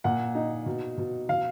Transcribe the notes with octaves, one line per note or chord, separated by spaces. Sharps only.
A#2 F#5
D#4
B2
B2
B2 F5